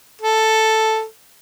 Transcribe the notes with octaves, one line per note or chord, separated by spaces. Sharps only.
A4